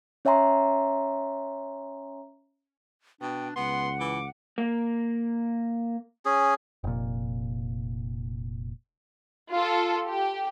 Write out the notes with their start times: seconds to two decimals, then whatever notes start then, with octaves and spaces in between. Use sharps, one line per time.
0.25 C#4 C#5 E5 G#5 A#5 C6
3.21 B2 D4 G5
3.56 C#2 B3 F#5 C6
4.00 E3 D6
4.58 A#3
6.26 C#4 G#4
6.84 F1 A#2
9.51 F4 A4
10.08 G4